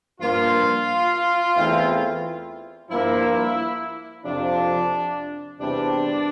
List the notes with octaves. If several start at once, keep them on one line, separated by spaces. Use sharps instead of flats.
G2 F3 A#3 F4
E2 E3 A3 C4 E4
G2 F3 A#3 E4
F2 C3 F3 D4
E2 C3 E3 G3 C4 D4